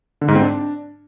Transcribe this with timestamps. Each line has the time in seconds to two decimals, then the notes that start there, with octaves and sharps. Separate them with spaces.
0.21 D3
0.28 G#2
0.35 C4
0.42 D4